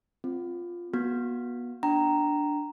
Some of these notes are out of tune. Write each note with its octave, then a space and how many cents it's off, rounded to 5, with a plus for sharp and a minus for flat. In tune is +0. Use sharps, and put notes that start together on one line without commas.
C4 +0 F4 +0
B3 -35 F#4 -20
D4 +0 G5 -30 A#5 +0